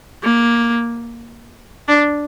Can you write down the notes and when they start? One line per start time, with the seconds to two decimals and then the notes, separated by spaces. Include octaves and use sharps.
0.24 A#3
1.88 D4